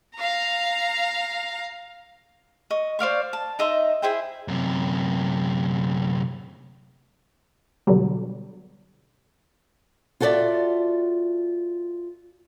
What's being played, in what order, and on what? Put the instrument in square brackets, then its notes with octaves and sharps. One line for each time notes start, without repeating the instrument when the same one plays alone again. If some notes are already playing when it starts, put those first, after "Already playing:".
[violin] F5 A#5
[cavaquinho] D#5 C#6
C5 D5 F5 C#6
A5
D#4 D#5 E5 C6
E4 G#4 C5 G5
[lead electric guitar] F#2 C3
[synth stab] B2 D3 F#3 G3
[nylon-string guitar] F4 F#4 A4 B4 D5 E5